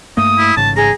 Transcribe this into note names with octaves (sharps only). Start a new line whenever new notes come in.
G2 A3 A#3 D#6
E4
A1 G#2 C#3 A5
G#4 A#5